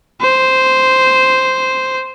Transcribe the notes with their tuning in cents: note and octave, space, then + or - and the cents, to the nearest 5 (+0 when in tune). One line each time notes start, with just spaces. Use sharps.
C5 -5